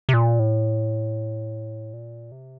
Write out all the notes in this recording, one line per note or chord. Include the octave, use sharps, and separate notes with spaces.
C3
A#2
A2
A#2
C3